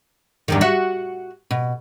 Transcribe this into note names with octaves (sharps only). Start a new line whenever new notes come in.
E2 G2 D#3
F#4 E5
B2